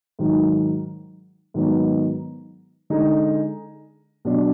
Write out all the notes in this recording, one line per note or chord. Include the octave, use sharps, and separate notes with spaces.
G#2 D#3 F#3
G#2 D#3 F#3 B3 D#4
D3 G#3 D#4 G#4
B2 F#3 D4